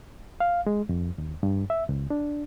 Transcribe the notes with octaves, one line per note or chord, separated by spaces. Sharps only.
F5
G#3
F2
D#2
G2
E5
C#2
D4